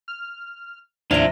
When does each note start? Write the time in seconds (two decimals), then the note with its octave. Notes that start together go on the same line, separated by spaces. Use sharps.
0.08 F6
1.11 D#2 A2 C3 F3 D4 E4 D#5 F5